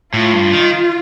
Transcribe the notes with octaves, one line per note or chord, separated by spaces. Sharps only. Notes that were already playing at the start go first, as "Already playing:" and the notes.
A2 F4
G2
D#3